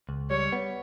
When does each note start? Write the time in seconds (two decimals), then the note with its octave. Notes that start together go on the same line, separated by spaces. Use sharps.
0.09 C#2
0.30 G3 C#5
0.52 B3